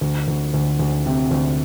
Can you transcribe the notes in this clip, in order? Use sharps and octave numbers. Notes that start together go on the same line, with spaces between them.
D2
D2
D2
D2
C3
D2